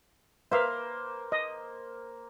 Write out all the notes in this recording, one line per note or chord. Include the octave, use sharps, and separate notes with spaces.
A#3 B4 C5 E5 F5
D#5